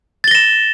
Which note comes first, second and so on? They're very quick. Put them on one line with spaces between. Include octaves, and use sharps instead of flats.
A6 G7 A#6 E7